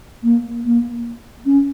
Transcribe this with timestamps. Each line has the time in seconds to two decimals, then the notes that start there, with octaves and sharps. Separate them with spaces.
0.23 A#3
0.65 A#3
1.46 C#4